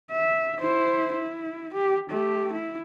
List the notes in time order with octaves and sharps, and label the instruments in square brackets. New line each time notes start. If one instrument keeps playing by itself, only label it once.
[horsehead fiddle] E5
E4 C5
E4
G4
A3 G4
E4